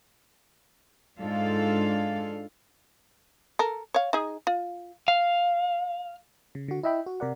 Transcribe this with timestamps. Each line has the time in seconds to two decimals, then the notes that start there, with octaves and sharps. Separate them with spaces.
1.20 G#2 D4 F4 A4 F5
3.59 A4 A#4
3.94 C#5 F5
4.13 D#4 G#4
4.47 F4
5.08 F5
6.55 C#3
6.68 D3 F#4
6.83 E4 D#5 E5 G5 B5
7.06 F#4
7.20 C3 A#4 D5 F#5